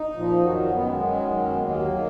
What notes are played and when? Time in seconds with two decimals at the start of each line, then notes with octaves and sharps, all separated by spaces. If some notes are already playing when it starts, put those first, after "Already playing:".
Already playing: D#4
0.13 A#2 F3
0.42 F#2 D#3 F#3 F#4
0.62 D#4
0.72 F#2 D#3 F#3 B3
0.86 G#3
1.01 F#2 D#3 F#3
1.30 F#2 D#3 F#3
1.42 C#4
1.50 B3
1.60 D#2 D#3 F#3 A#3
1.88 D#3 F#3